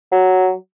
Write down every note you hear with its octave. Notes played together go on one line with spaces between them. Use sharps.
F#3